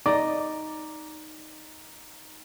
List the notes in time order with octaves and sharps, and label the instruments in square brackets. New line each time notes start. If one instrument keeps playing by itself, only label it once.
[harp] D#4 D#5 [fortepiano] D5